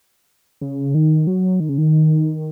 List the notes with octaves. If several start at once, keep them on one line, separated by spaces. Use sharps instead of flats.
C#3
D#3
F#3
D#3
C#3
D#3